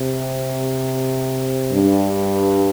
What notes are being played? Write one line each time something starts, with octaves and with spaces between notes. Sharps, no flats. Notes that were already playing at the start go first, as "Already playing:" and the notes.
Already playing: C3
G2